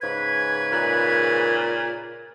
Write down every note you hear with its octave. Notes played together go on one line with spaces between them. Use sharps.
G#2 C#3 B4 G#6
A#2